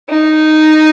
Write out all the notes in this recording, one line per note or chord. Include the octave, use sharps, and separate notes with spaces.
D#4